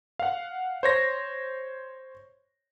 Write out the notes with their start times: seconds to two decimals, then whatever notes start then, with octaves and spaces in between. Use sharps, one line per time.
0.19 F5 F#5
0.83 C5 C#5 A#6